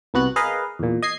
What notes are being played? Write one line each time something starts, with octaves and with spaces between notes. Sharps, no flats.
C2 B3 F#4 F#6
G#4 A#4 B4 D#5 F5
E2 A#2
D#5 G#6 C7